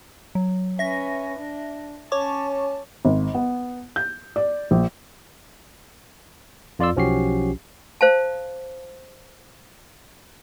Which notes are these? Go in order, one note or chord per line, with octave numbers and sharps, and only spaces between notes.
F#3
C#4 B4 E5 A#6
D4
C#4 C#5 A5 C#6 D6
G#1
B3
G6
D5
A#1
F2 F4 D5 C6 E6
B1 F3 C#4 F#4 G4 C7
C5 F5 A5